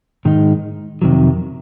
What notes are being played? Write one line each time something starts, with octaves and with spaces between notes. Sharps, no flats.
G#2 D#3 G#3 D#4
F2 C3 D#3 F#3